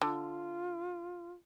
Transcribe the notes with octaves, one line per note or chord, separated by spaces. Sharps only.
D3 F4